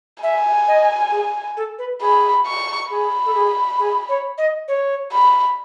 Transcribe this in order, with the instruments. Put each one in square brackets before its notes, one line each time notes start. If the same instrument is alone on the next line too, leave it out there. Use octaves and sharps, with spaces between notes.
[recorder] E5 [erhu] G#5
[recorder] D#5
G#4
A4
B4
[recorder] G#4 [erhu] B5
[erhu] C#6
[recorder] G#4 [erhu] B5
[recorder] A4
G#4
G#4
C#5
D#5
C#5
[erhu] B5